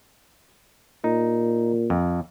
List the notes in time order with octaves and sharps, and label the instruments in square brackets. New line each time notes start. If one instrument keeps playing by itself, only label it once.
[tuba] A#2 [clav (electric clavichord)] D#4
[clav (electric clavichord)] F2